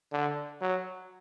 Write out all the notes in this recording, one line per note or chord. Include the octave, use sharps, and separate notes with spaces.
D3
F#3